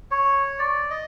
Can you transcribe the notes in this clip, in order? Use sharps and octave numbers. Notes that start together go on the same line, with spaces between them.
C#5
D5
D#5